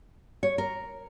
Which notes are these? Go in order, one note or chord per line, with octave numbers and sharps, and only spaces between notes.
C#5
A#4